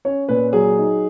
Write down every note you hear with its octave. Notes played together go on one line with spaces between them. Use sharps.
C#4 C#5
A#2 B4
F#3 G#4
D#4